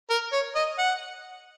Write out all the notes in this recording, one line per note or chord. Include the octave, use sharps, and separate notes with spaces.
A#4
C#5
D#5
F#5